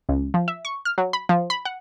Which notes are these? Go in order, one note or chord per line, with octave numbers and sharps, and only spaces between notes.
C#2
F3
E5
C#6
F6
F#3
B5
F3
B5
F#5